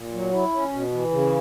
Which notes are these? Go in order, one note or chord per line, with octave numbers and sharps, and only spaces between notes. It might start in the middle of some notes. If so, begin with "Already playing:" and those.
Already playing: A#2
F#3
E4
C#4
B2
E3
C#3